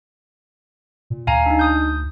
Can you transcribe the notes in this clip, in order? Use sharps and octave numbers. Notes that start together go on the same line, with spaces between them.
A#2
D2 F5 G#5 A#5
D4 D#4
D#6 G6